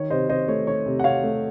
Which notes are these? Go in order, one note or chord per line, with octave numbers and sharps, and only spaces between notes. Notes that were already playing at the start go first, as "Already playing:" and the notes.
Already playing: D#3 C#5
C3 C5 D#5
C3 C5 D#5
A3 C#5
D#3 C#5
C3
F#5
C3 C#5 F5
A3